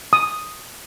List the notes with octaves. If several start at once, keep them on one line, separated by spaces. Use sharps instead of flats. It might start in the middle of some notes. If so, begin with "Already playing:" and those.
D#6